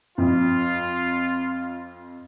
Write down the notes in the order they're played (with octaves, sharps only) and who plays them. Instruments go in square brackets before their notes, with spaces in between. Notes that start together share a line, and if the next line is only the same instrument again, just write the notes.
[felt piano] F2 [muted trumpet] F4